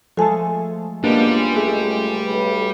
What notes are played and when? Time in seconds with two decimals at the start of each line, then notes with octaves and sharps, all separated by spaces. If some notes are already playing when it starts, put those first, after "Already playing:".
0.17 F3 G#3 A3 A4 G#5 A5
1.04 C#2 G3 G#3 A#3 B3 D4
1.56 A3 G#4
2.27 B1 B4